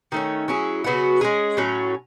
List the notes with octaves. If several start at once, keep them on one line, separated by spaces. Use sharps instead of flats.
D#3 A3 C#4
F#3 C#4 E4 G#4
C#3 F#3 B3 F#4
G#3 C#4 G#4
A2 F#3 A3 C#4